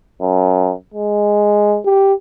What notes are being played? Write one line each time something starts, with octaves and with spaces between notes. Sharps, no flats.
F#2
G#3
G4